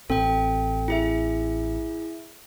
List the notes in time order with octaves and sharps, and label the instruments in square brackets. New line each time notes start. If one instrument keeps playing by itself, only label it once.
[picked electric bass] A1 C4 [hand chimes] A4 G5
[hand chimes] E4 G#4 E5